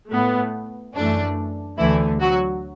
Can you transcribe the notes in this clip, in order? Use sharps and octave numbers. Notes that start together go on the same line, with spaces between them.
A2 A3 B3
F#2 E3 A3 D4
D2 D3 E3 A3 E4
F#3 F#4